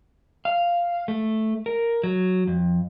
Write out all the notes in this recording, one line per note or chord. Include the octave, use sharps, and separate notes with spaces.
F5
A3
A#4
F#3
F2